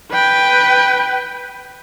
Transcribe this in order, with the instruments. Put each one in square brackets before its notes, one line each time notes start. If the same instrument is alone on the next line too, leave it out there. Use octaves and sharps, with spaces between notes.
[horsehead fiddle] B4 G5